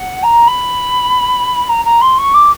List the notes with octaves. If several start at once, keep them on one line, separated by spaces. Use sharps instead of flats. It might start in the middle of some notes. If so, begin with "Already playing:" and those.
Already playing: F#5
A#5
B5
A#5
A#5
C6
C#6
D6